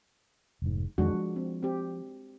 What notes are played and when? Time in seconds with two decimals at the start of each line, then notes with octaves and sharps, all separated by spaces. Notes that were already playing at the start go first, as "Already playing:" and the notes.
0.62 F1 G#2
0.98 F2 D#3 G#3 D4 F#4
1.13 F3
1.36 C4
1.63 C4 G4